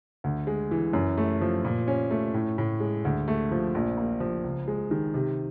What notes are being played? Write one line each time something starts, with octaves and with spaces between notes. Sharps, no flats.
D2
G#3
E3
F#2
A3
F3
A#2
C#4
A3
A2
A2
G#3
D2
A3
F3
A#1
A#3
F3
C#2
G#3
D#3
C3